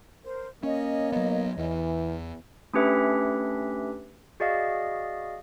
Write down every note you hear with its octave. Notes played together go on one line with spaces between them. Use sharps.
A#4 C5
A#3 C#4 C#5 D#5
F#3 B3
E2 E3
A3 C#4 D4 G4 B4 E5
F#4 G#4 D5 D#5 F5